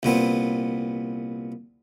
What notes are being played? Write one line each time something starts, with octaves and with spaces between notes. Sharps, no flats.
C2 A#2 B3 C4